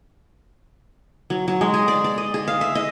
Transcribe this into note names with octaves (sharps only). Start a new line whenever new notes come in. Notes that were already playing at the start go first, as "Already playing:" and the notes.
F#3
F#3
G#3
G#4
D5
D5
D#5
G#4
F5
E5
D#5